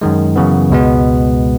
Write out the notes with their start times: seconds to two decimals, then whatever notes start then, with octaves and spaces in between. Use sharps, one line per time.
0.01 F#2 D#3 G#3
0.36 F#2 C#3 E3 B3
0.70 C#2 B2 G#3 B3